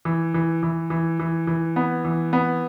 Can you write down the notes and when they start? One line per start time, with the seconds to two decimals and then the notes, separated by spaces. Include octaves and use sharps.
0.05 E3
0.34 E3
0.63 E3
0.90 E3
1.19 E3
1.47 E3
1.76 B3
2.05 E3
2.33 B3